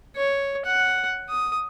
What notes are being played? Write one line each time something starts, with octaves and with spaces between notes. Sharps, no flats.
C#5
F#5
D#6